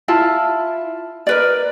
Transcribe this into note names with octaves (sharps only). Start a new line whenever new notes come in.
E4 F4 A5
A#4 B4 D5